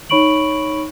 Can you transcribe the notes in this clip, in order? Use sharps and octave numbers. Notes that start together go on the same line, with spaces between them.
D#4 C#5 B5 C#6 D7 F#7